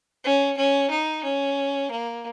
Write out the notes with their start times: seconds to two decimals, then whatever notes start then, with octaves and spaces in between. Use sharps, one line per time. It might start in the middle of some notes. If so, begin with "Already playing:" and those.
0.24 C#4
0.57 C#4
0.90 D#4
1.24 C#4
1.91 A#3